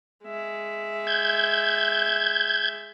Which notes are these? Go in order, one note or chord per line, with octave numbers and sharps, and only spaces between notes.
G#3 E5
G6 G#6